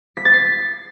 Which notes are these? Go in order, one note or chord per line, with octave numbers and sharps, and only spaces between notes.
B6
A6
C7